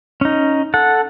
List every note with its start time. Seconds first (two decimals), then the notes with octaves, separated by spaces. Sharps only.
0.21 C#4 D#4
0.74 A4 F#5